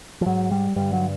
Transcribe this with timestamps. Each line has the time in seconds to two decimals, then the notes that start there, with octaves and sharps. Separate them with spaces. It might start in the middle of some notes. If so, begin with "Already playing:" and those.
0.21 F3
0.26 G#2 F#3
0.51 G3
0.76 G2 D3 G3
0.93 F#3